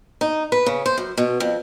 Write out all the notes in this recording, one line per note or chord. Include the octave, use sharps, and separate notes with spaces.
D#4
B4
C#3
C5
F#2
B2
F2